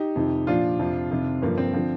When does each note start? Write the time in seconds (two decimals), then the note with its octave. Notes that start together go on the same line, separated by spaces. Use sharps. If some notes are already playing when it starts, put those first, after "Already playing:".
Already playing: D#4 G4
0.16 F2 C3 D#3
0.47 A#2 F3 D4 F4
0.79 F2 C3 F3
1.11 F2 C3 D#3
1.42 G2 D3 F3 A#3
1.58 C4
1.73 D3 F3